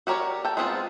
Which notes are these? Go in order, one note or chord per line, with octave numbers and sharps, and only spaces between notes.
F#4 G4 A#4 C#5 D5
A4 G5
G#3 B3 C4 E4 F4